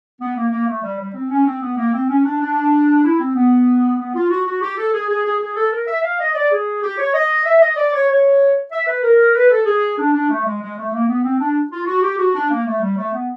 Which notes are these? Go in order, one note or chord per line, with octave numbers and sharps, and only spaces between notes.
B3
A#3
A#3
A3
G3
G3
C4
C#4
C4
B3
A#3
C4
C#4
D4
D4
E4
C4
B3
B3
F4
F#4
F#4
G4
A4
G#4
G#4
G#4
G#4
A4
A#4
E5
F5
D#5
D5
G#4
G4
C#5
D#5
E5
D#5
D5
C#5
C#5
E5
B4
A#4
B4
A4
G#4
D4
D4
A3
G#3
G#3
A3
A3
A#3
B3
C4
D4
F4
F#4
G4
F#4
D4
A#3
A3
G3
A3
B3